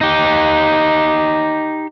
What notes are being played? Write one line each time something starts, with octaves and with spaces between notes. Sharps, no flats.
D#4 G4